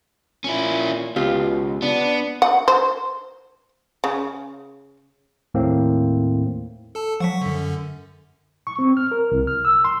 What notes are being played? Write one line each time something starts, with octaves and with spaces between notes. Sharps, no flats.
A#2 C#4 E4
C#2 B2 F4 G4
B3 D4
F#5
C5
C#3
D#2 A2 A#3 C4
A4 A5
F3 F#3 F#5 C#6 B6
F#2 D3
C#6
C4
F6
A#4
C2
F6
E6
C6